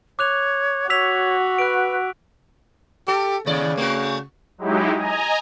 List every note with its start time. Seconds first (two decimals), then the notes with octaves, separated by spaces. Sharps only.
0.19 C#5 D6 F#6 F7
0.90 F#4 C#5 E6 B6 F7
1.58 B4 F#6 D7
3.08 G4 A4
3.46 D#2 A2 C#3 D5
3.78 A3 F#4
4.58 F#3 G#3 D#4 E4 G4
4.95 D#5 G#5 A#5